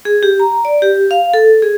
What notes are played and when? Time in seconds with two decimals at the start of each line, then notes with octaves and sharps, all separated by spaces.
0.05 G#4
0.23 G4
0.40 A#5
0.65 D5
0.82 G4
1.11 F5
1.34 A4
1.62 G#4